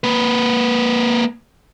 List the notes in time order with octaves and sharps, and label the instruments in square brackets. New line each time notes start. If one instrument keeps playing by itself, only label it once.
[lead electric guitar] A#3 B4